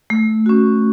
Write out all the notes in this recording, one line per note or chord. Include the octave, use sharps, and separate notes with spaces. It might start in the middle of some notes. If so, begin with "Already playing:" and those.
A3
C#4 F#4